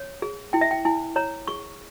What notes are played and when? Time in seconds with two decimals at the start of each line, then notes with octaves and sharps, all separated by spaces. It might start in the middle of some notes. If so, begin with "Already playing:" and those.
Already playing: C#5
0.22 G#4
0.53 E4 G5
0.61 E5
0.71 G5
0.85 E4 G#5
1.16 C#5 A#5
1.47 G#4 C#6